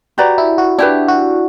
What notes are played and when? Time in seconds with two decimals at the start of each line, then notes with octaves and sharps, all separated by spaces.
0.18 F#4 G4 B4 D5 A#5
0.38 E4
0.58 F#4
0.78 D4 E4 G4 B4
1.08 F#4